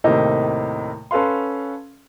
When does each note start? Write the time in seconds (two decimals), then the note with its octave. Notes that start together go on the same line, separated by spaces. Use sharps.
0.04 D#2 A2 C3 A#3 D#4
1.11 C#4 A4 B4 F5 C6